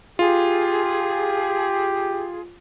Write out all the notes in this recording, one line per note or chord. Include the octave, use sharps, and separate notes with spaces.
F4 G4 G#4